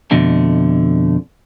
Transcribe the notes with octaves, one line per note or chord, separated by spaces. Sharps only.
F2 B2 D3 A3